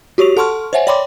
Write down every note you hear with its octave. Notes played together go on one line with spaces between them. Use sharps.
F#4 G4 C#5 C#6 F7
A4 F#5 A5 C6 C#6 F6
C5 C#5 E5 F#5 G#5
C#5 D5 G5 B5 C6 D6